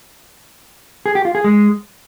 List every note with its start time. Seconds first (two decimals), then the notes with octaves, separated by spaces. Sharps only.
1.06 G#4
1.15 G4
1.25 F4
1.35 G#4
1.44 G#3